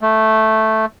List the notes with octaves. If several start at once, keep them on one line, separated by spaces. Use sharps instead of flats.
A3